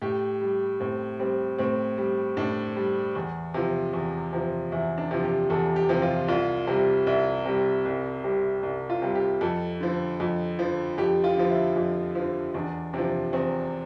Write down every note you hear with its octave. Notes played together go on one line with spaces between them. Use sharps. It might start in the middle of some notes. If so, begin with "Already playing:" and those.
A2 G4
G3
A2 C4
G3 C4
A2 C4
G3
A2 D4
G3
E2
C3 F3
E2
C3 F3
E2 E4
D4
C3 F3
G4
E2 A4
G4
C3 F3
F4
C2 F4
C3 G3
C2 E4
C3 G3
C2
C3 G3
C2
F4
C3 G3
G4
F2 A4
D3 F3
F2
D3 F3
F2 G4
F4
D3 F3
E4
F2
D3 F3
E2 D4
C3 F3 D4
E2 C4